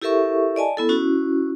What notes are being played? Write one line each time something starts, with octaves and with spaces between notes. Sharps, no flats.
E4 G4 A4 A#4 E5 C#6
D5 D#5 G#5 A5
B3 E4 A4
C#4 E4 F#4